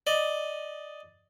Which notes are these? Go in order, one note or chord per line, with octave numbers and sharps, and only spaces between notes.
D5 D#5